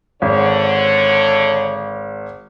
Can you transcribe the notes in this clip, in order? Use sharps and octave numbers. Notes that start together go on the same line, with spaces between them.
G#1 D3 C#5